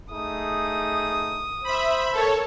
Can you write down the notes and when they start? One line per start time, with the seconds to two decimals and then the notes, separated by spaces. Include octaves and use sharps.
0.11 A3 D#4 G#4 D#6
1.64 C5 E5 B5
2.13 A4 A#4 C#5 A5